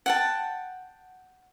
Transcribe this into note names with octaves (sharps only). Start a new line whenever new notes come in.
F#5 G5 A5